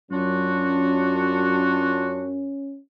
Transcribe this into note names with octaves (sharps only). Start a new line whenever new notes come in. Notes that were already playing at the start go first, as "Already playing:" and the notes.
F#2 C#4 D4 F4 F#4